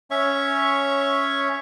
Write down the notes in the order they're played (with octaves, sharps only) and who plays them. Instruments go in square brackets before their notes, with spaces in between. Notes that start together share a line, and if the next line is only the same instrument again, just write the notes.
[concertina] C#4 C#5 [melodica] E5 C#6